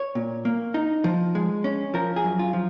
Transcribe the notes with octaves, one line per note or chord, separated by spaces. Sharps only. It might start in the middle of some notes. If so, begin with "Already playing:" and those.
Already playing: C#5
A#2
A#3
D#4
F3
G#3
C#4
F3 A#4
G#4
F#2
F4
F3